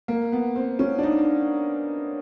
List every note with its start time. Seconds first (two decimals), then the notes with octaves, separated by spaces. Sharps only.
0.08 A#3
0.32 B3
0.56 C4
0.79 C#4
0.98 D4
1.03 D#4